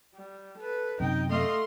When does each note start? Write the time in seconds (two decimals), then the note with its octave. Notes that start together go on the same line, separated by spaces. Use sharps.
0.15 G3
0.57 A4 B4
1.00 F#2 C3 D#4 G5
1.30 A3 D#5 F5 C6